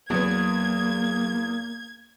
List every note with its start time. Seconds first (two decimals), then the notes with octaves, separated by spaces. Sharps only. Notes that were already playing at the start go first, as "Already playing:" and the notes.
0.10 E2 F#3 A#3 B3 G#6